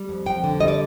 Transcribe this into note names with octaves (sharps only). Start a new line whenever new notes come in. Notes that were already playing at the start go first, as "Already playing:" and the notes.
Already playing: G3
F2
F2 G5
D3
G3 D#5
D5